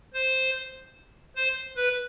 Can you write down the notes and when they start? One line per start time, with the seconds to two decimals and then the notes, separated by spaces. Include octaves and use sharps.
0.14 C5
1.36 C5
1.77 B4